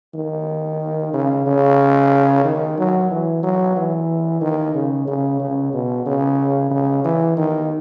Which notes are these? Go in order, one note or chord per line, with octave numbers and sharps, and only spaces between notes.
D#3
C#3
C#3
D#3
F#3
E3
F#3
E3
D#3
C#3
C#3
C#3
B2
C#3
C#3
E3
D#3